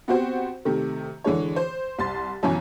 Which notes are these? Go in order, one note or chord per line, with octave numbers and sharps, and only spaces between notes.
B3 C4 F#4 G4 C5
C3 D#3 A3
D3 E3 G#3 C#5
C5
C2 C6 A6
G1 F#2 B2 E3 C#5 G#5